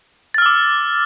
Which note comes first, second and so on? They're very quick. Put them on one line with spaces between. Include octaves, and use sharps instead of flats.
A6 F6 E6 D6